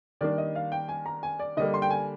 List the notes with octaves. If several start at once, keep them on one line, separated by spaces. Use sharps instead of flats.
D#3 G3 A#3 D4 D5
D#5
F5
G5
G#5
A#5
G#5
D5
D3 G3 A#3 D#5
C6
G5
G#5